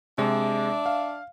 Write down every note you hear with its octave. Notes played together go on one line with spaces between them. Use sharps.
C3 G#3 D4 D5 E5
F5